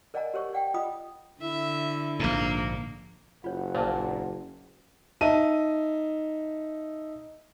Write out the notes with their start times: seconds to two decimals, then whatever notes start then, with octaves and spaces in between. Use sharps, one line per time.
0.14 A#4 D5 D#5 F#5 G#5 A#5
0.34 G4 A#4 C#5 C#6
0.53 D5 F#5 G5
0.74 F4 D#5 B5 D#6
1.41 D3 E4 E5
2.19 A#1 G#2 A#3
3.44 F#1 F4 C#5 F#5
3.75 A#1 A#2 C5 A5
5.21 D#4 E5 A5 D#7